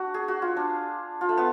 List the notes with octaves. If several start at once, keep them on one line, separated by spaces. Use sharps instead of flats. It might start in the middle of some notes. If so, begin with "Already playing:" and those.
Already playing: D4 F#4
G#4
F#4
F4
D4
F4
A3
B3